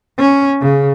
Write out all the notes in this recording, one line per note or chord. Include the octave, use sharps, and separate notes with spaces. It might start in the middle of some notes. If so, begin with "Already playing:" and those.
C#4
C#3